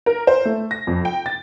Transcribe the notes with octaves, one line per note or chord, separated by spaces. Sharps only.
A#4
C5
A3
A#6
F2
G5
A6